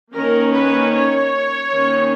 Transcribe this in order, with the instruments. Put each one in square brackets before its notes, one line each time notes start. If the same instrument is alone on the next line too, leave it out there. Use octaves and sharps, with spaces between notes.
[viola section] D#3 A#3 C#4 A#4
B4
C#5
D#3 A#3 C#4